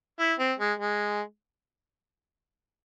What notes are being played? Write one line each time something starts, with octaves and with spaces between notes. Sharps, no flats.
E4
C4
G#3
G#3